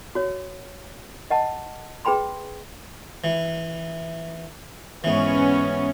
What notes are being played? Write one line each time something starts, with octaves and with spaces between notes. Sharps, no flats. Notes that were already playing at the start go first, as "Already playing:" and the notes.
F#4 C#5
D#5 F#5 A5
G#4 B4 G5 B5 C6
E3
G#2 E3 B3 C#4